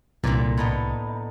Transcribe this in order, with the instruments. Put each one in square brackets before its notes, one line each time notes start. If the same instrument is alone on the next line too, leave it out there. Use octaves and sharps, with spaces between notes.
[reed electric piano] C2 [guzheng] A#2 D3
[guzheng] A2 B3 D#4